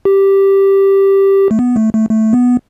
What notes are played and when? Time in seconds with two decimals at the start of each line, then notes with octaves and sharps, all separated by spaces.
0.05 G4
1.51 A3
1.59 B3
1.76 A3
1.93 A3
2.10 A3
2.33 B3